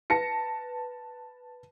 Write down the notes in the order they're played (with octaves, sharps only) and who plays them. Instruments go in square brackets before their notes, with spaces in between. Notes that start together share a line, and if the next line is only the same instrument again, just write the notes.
[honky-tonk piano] B4 A5 A#6 C#7